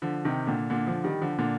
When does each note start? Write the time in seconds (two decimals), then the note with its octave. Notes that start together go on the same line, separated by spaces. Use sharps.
0.02 D3 F3
0.25 C3 D#3
0.47 A#2 D3
0.70 A#2 D3
0.87 D3 F3
1.04 D#3 G3
1.21 D3 F3
1.38 A#2 D3